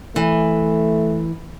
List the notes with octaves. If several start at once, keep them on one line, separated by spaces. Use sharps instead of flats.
E3 A3